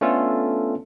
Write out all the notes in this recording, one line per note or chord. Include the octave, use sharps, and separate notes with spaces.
A3 B3 C#4 D4 F4 A4